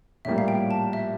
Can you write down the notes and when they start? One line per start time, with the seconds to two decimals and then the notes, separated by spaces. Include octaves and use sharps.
0.25 A#1 A2 G3 A#3 E5
0.38 F5
0.48 G5
0.71 A5
0.93 E5